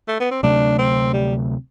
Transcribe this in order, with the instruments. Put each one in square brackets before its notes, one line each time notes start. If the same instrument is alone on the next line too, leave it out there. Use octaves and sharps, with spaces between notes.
[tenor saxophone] A3
B3
C4
[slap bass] D2 C3 F#3 A3 [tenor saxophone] D4
[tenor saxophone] C4
G3